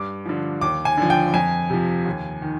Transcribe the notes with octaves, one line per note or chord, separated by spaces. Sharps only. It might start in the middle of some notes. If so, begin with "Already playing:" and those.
Already playing: G2 D6
D3 F3
D#2 D6
G#5
D3 F3
G5
F2 G#5
C3 F3
D#2
D#3